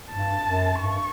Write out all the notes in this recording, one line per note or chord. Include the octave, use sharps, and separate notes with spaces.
G2 A5
F#2
G2 C#6